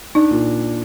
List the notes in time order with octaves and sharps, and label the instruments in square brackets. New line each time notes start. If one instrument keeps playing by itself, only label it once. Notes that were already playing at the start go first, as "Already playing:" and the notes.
[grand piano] D4 [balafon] D#4
[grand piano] A#2